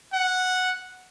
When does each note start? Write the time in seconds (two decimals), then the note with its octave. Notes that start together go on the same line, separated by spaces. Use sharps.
0.14 F#5